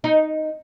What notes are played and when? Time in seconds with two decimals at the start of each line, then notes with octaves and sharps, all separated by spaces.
0.04 D#4